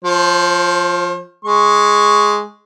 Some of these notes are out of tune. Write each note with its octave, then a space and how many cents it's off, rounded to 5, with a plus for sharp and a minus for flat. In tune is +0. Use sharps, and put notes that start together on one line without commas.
F3 +0 C5 +40
G#3 +0 C#6 +0